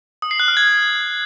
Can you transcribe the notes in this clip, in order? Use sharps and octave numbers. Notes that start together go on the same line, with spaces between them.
D#6
C7
F#6
F6
G#6